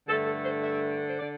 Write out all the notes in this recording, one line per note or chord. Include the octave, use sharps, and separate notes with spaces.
G2 D3 A3 A4
A4
C5
E5
C5
D3 D5